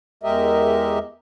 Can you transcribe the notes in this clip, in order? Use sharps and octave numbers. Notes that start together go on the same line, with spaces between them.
E2 G#3 G4 A#4 D#5 E5